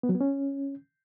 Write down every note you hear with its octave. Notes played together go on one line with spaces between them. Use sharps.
B3
F#3
B3
C#4